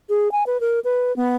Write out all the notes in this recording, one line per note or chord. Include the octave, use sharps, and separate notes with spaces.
G#4
G#5
B4
A#4
B4
B3